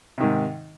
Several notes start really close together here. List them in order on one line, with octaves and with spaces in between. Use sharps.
C3 D#3 G#2